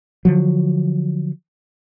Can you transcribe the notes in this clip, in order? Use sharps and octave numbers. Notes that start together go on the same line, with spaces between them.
D3 F3 F#3